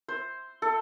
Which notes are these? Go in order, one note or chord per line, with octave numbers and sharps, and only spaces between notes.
C5
A4